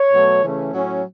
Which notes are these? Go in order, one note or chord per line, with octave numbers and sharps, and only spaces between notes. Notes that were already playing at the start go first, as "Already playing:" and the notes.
Already playing: C#5
B2 F#3 A3
C#3 E3 A3 C#4
A2 F#3 C#4